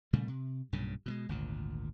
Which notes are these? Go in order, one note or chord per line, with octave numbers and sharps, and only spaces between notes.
A#2 C#3 G3 A3
C3
B1 G2 A#2 C#3
B2 G3 G#3
G#1 D2 A#2